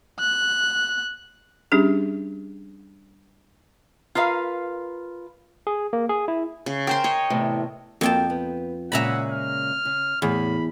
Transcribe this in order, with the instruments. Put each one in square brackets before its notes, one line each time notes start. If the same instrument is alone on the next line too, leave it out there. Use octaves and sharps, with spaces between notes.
[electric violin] F#6
[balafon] G3 C#4 D4 G4 G#4
[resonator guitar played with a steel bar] F4 A#4 B4 D5 F5
[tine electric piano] G#4
A#3
G#4
E4
[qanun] C#3
[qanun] A#4 C5 C6 [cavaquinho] G5
[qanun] C#5 D#5
[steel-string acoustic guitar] E2 A2 C3
[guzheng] F2 G5 A5 [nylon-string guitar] A#3 F#4
[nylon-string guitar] B3
[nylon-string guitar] A#2 C#3 G#3 [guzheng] E5 A#5 B5 [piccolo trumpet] F#5
[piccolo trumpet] F6
[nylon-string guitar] C#3
[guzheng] E2 [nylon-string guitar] A2 [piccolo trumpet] B5